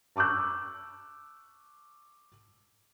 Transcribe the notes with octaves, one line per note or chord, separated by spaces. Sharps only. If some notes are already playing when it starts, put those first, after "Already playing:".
A5 C#6 D6 E6 F#6